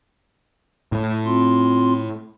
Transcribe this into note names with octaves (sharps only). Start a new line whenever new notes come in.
A2 A3
C4 F4 C6